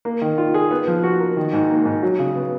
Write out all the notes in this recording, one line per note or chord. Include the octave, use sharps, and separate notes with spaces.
A#3
D#3
F4
G#4
B3
F3
F#4
A#4
D#3
G#2
A#3
G#2
F#3
C#3
B3